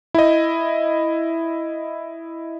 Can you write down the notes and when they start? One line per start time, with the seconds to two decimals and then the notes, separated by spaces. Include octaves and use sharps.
0.14 E4 D#5